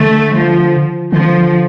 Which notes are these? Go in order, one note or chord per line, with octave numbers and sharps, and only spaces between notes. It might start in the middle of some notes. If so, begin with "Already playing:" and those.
Already playing: D3 A3
F3
D3 F3